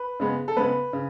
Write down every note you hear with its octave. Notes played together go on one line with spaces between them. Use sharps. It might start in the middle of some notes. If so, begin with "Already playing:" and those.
Already playing: B4
C#3 G#3 B3
A4
C#3 G#3 B3 B4
C#3